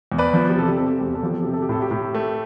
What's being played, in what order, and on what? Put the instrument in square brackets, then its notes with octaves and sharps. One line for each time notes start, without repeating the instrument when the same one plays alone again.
[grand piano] E2
B4 D5
F3
G4
C3 A4
G4
C4 A4
G4
A4
E2 G4
A4
F3 G4
A4
C3 G4
A4
G4
A2 A4
G4
A2
A3